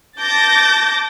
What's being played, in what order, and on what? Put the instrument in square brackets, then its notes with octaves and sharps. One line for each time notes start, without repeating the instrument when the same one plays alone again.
[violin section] A5 D6 G6 A6 A#6